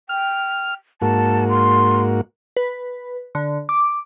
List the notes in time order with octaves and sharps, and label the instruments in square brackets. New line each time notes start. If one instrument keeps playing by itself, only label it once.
[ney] G5 [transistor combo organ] F6
[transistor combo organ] G#2 A#3 F#4 [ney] A5
[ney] C6
[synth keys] B4
D3
D6